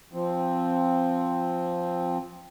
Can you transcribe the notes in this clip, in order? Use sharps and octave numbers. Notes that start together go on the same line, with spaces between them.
F3 C4